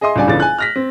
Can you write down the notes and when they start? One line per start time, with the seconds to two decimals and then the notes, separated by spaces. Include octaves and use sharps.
0.01 G#4 D#5 E5 C6 D#6
0.16 C#2 G3 D4 D5 G#5
0.28 G1 C#2 E3 D4 D5 A6
0.40 G#5 F#6
0.59 F6 A#6 B6
0.76 C4